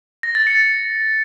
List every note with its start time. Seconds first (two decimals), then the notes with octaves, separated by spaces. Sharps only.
0.23 A#6
0.35 A6
0.47 C#7